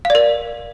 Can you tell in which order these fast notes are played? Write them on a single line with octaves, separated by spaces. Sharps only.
F5 D5 A#4